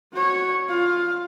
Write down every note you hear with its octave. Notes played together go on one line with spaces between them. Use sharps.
F#4 C#5
F4 F5